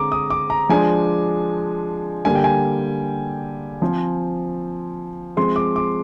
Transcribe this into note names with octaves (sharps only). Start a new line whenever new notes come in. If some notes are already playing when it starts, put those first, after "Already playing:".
Already playing: D3 G#3 C4 A#5 D6
D#6
D6
A#5
F3 G#3 D4 G#5
D3 G3 A#3 G#5
G5
G#5
F3 C4
F3 G#3 C4 C6
D6
D6